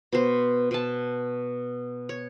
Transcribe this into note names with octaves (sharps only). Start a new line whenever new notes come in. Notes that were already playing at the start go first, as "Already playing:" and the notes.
B2 C5
B2 A5
C#5